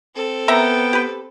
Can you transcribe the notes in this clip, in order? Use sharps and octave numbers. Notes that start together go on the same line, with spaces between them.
C4 A4
B3 A#4 E5 G5 A#5
G4 B4